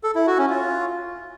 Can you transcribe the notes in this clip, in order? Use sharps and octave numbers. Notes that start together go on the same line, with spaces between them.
A4
E4
F#4
C#4
F4